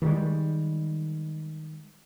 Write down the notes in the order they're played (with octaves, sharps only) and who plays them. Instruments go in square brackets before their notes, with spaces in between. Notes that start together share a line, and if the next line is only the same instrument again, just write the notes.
[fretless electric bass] D#3 F3 G3 G#3